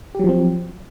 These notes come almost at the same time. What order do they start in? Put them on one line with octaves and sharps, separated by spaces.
G4 F#3 F3 C4